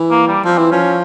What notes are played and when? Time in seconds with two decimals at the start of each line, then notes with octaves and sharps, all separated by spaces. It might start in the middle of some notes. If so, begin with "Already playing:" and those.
Already playing: E3
0.11 A#3
0.28 G3
0.45 F3 C4
0.58 E3
0.71 F3 C#4